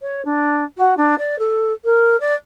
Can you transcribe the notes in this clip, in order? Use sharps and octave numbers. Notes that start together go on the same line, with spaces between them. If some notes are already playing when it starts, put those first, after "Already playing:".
C#5
D4
F#4
D4
D5
A4
A#4
D5